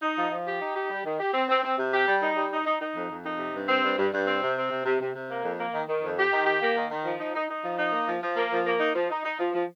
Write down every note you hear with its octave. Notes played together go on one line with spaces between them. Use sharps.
D#4
F3
F3
G4
D#4
G4
G3
D#3
G4
C4
C4
C4
C3
G4
G3
D#4
G3
D#4
D#4
D#4
F2
F2
D#4
C3
G2
C4
G2
G2
G2
C4
C3
C4
C3
C3
C3
C3
A#3
F2
A#3
D#3
D#3
F2
G4
D#3
G4
A#3
D#3
D#3
F3
D#4
D#4
D#4
F3
D#4
A#3
F3
F3
A#3
F3
A#3
D#4
F3
D#4
D#4
F3
F3